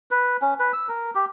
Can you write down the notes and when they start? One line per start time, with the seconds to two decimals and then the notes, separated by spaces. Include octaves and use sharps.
0.11 B4
0.42 C#4
0.59 B4
0.73 E6
0.89 A#4
1.15 G4